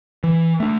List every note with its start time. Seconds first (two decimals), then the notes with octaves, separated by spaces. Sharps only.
0.24 E3
0.60 A3 D4